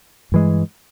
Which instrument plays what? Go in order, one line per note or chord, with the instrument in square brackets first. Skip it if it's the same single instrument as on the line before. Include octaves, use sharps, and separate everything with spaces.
[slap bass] G2 E3 G#3